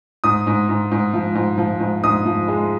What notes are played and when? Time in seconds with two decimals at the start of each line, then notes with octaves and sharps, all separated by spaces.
0.24 G#2 D#6
0.47 G#2
0.69 G#2
0.91 G#2
1.14 F3
1.35 G#2
1.58 F3
1.80 G#2
2.04 G#2 D#6
2.26 F3
2.48 G#3